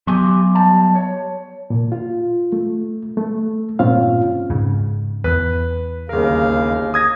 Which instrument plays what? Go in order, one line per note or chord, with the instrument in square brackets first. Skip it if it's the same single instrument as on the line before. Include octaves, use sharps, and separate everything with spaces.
[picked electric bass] F#3 B3 [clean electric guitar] G4 G#5 C6
[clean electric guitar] G3 A5
C#5
[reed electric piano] A#2
F4
A3
A3
G2 A#2 C4 C#4 F4 F5
[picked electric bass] G#2 C#3
[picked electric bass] E2 [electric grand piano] B4
[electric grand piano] G1 A#4 [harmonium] D#2 C#3 F5
[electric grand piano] D#6 G#6 A#6